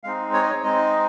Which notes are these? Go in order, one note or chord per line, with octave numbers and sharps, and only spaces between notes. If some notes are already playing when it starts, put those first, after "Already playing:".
G#3 C4 D#4 F5
C#5
D#5
C#5
G#3 C4 D#4 D#5